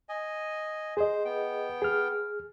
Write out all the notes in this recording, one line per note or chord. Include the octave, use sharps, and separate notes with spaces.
D#5 G#5
G#4 C5 D#5
B3 G5
G#4 F6